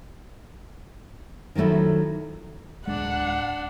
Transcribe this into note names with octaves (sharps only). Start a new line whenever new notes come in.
D#3 F3 F#3 A3 E4
D1 G#1 G#3 D4 F#5